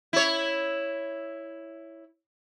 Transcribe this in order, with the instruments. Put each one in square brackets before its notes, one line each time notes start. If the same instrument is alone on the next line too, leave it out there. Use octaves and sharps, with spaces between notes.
[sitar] E4 C#5